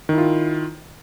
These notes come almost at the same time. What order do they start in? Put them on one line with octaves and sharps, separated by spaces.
D#3 E4 F4